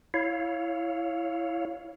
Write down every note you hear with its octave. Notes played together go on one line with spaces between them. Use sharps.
E4 C#5 F5